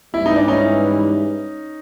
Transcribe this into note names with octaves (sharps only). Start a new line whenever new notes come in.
G#2 E3 G3 E4
D#4
D4
C#4 D#4